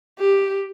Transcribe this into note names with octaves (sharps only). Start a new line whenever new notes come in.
G4